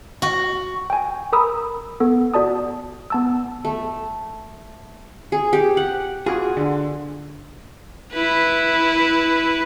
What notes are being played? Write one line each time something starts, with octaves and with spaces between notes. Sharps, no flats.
F#4
G5 G#5
A#4 A#5 B5 D#6 E6
B3 A4
F#4 D5 A5 D#6
B3 A5 E6
A3
G#4
G4
F#5
F4 F#4 G#4 G#5
D3
E4 B4